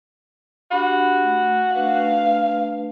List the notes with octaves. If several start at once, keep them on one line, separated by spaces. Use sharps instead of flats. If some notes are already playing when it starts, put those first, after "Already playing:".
D4 F#4 G4 B5
A3
A3 D4 B4 F5